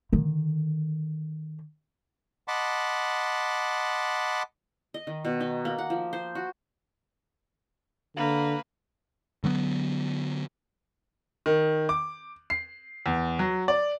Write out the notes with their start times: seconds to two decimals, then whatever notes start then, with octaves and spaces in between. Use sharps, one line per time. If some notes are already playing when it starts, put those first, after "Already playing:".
0.12 D3 D#3
2.48 D#5 F#5 A5 B5 C6 D6
4.94 D#5
5.07 D#3
5.25 B2
5.40 D#4
5.65 A#3
5.78 F#5
5.90 F3
6.13 C5
6.35 F#4
8.17 D3 A#3 B4
9.44 D3 F#3 G3 B3
11.46 D#3
11.89 D6
12.50 C7
13.06 E2
13.39 F#3
13.68 D5